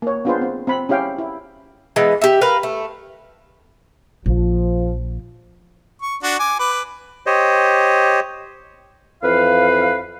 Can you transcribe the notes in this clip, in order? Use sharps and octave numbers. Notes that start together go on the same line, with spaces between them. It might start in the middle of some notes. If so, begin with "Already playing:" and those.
A#3 C#5
B3 D4 F4 G#4 B4 C5
C4
C4 B5
C#4 E4 G4 F5 G5
E4
E3 G#3 B3
G4 E5
A#4 B4 F5
A3
A#1 F3
C#6
D4 F#4
G#5 D6
B4 D6
G4 C5 C#5 D#5
F2 E3 B4 F5